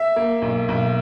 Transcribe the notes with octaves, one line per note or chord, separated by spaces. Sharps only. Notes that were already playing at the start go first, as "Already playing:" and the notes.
Already playing: E5
A#3
B1
B1